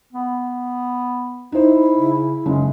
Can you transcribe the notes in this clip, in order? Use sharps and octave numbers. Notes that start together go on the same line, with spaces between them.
B3
D#4 E4 C5
C#3
F#1 G#3 C#4